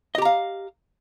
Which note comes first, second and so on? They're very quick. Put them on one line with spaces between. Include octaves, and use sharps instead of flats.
D#5 G4 A#5 F5